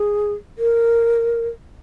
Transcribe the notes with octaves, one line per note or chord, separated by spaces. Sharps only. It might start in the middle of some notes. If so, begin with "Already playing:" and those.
Already playing: G#4
A#4